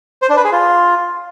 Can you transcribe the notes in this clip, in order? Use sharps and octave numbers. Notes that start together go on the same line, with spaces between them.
C5
D4
B4
G#4
F4